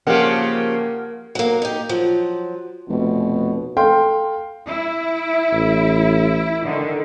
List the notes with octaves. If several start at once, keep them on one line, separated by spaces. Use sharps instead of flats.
C#3 F3 A#3 G4 A#4 F5 F#5
F#3 A#3
D#4 G4
F3 F#3
F1 B2
A4 F5 G5 C6
E4
A1
D3 D#3